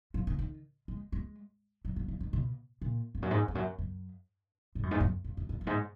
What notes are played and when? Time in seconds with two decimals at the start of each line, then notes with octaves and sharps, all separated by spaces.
0.14 F3
0.27 D#3
0.39 D#3
0.88 G#3
1.12 G#3
1.85 F#3
1.96 F#3
2.08 F3
2.20 D#3
2.33 B2
2.82 A#2
3.15 F2
3.22 F#2
3.31 G#2
3.48 F2
3.55 F#2
3.79 F#2
4.75 G#2
4.83 F#2
4.91 G#2
5.00 F#2
5.24 F2
5.37 F#2
5.49 F2
5.61 F#2
5.67 G#2